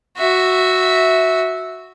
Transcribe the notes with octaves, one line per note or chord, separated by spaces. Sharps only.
F#4 E5